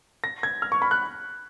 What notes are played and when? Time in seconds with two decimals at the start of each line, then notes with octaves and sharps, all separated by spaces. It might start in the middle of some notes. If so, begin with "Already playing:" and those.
0.24 A#6
0.43 G#6
0.62 F6
0.72 C#6
0.82 B5
0.91 F#6